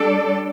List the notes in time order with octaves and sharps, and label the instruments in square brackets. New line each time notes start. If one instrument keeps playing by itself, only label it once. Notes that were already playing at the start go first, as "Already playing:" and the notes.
Already playing: [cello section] G3 D4 A4 D5